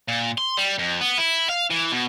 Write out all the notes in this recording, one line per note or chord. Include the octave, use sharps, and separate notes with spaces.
A#2
C6
G3
F2
B3
E4
F5
E3
B2